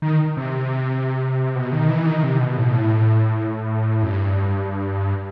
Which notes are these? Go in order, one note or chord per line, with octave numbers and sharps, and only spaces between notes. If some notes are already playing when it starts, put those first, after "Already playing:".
D#3
C3
B2
D#3
E3
D#3
C3
B2
A2
B2
A2
F#2
G2